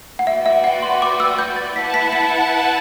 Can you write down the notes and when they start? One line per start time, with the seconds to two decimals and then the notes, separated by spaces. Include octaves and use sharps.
0.19 F#5
0.27 F#4 B4 D5 E5 G5
0.46 E5
0.64 F#5
0.82 C6
1.02 D6
1.20 E6
1.39 G6
1.56 A6
1.76 E4 B4 F#5 A5 B6
1.94 B6
2.12 B6